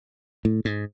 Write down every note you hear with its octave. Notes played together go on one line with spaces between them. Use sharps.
A2
G#2